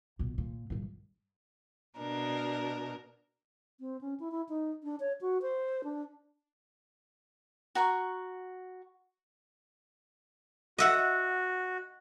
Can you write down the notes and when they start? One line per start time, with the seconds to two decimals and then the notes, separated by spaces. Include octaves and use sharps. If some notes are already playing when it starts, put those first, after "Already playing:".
0.19 A#1 B2
0.38 A#2
0.70 A#1 G2
1.97 B2 D4 A#4
3.80 C4
4.01 C#4
4.20 E4
4.31 E4
4.49 D#4
4.84 D4
5.00 C#5
5.21 F#4
5.42 C5
5.84 D4
7.75 F#4 A#5 C#6
10.78 F#4 D#5 E5 F#5